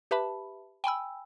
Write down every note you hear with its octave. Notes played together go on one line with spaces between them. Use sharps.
G4 B4 E5 A5 B5
G5 G#5 B5 E6